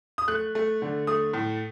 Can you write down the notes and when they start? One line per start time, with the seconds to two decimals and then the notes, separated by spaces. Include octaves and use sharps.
0.18 D#6
0.28 A3 F#6
0.55 A3
0.82 D3
1.07 A3 D#6
1.34 A2